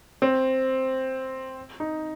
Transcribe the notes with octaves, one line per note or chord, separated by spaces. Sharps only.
C4
D#4